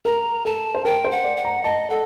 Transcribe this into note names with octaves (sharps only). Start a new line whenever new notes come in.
A#4 A#5
A4 A5
C5
A#4 G5
C5
F#5
D5
F#5
A#5
D#5 A5
A4 F#5